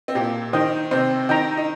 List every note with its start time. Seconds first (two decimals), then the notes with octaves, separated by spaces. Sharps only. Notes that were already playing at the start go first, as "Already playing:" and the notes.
0.08 C4
0.15 A#2 A#3 G4
0.53 D#3 D#4 C5 D#5 G5
0.91 C3 C4 C5
1.29 D#3 D#4 G5 A#5
1.57 D#4